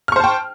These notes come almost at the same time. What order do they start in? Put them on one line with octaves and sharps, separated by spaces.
F6 C#6 C5 A5 G5